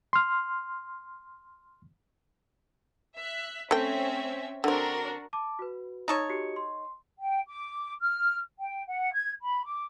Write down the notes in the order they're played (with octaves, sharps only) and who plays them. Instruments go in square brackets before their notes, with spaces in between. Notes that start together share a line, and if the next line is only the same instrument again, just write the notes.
[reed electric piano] C6 F6
[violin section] E5 F#6
[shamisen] A3 G5 [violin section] C4 C#4 E5
[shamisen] D3 C4 [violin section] D4 F#4 A#4
[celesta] A5 D6
F#4 B4
[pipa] D#4 A4 C#5
[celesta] F#4 G4 C#7
C6
[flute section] G5
D6
F6
G5
F#5
G#6
B5
D6